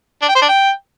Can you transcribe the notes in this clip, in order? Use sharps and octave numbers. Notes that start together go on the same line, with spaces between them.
D4
G5
C5
D4
G5